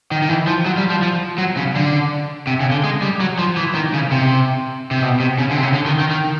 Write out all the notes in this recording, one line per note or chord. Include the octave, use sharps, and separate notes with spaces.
D#3
D#3
E3
F3
F#3
G3
F3
F3
F#3
C#3
D3
C3
C#3
D3
G#3
G3
F#3
F3
E3
D#3
C#3
C3
C3
B2
C3
C#3
D3
C3
C#3
D3
D#3
D#3
D#3